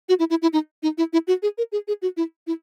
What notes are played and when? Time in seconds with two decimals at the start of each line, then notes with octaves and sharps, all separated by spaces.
0.09 F#4
0.19 E4
0.30 E4
0.42 E4
0.53 D#4
0.83 D#4
0.98 E4
1.13 E4
1.27 F#4
1.42 G#4
1.58 A#4
1.72 G#4
1.88 G#4
2.02 F#4
2.17 E4
2.47 E4